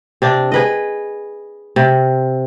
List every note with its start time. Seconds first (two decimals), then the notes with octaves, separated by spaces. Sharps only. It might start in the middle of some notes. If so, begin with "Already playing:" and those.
0.22 C3 D4 D5
0.52 G#4 B4 D#5
1.76 C3